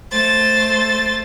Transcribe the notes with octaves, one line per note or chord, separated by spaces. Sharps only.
A3 C5 A6